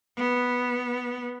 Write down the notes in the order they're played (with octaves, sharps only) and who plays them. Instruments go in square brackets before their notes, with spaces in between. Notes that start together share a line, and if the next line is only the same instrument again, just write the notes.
[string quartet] B3